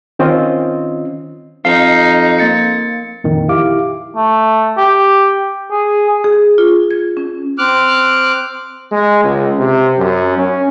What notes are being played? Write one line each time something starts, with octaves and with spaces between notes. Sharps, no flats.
D#3 C4 C#4 F4 D#5
F2 D#4 F5
A#3 A6 C#7
F2 A#2 D#3
E4 G4 F5 D6
A3
G4
G#4
G#4
F4
G#6
C#4
C4 D6 F6 F#6
G#3
C#2
C3
F#2
C#4